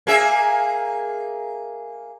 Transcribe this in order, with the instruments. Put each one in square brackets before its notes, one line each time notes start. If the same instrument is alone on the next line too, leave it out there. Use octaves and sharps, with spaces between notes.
[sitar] A#3 G#4 E5